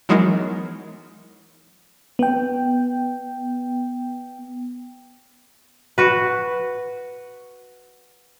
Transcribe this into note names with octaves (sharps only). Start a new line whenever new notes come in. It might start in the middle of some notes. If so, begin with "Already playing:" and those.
E3 F#3 G#3 B3 D#4 A#4
B3 G5
F#4 B4